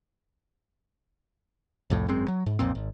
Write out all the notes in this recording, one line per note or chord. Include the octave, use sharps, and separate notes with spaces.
C2 F2 A2
G#1 F#2 G#3 C4
F#3
G#2
B1 F2 A#2 C4
G#1